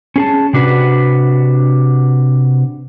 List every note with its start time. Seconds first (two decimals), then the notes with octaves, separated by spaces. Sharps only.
0.16 C#4 G#4 A5
0.53 C3 D4 F#4 B4